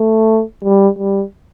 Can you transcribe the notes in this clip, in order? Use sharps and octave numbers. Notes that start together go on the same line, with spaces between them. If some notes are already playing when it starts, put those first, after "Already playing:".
Already playing: A3
G3
G3